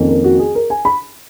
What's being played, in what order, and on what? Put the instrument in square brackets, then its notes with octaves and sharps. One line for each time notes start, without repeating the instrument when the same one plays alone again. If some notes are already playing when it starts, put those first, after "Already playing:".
Already playing: [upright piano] F2 D#3 A#3 C#4
A#4
F#4
G#4
A#4
G#5
B5